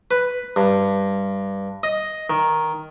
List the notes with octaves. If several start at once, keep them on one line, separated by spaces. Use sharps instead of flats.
B4
G2
D#5
D#3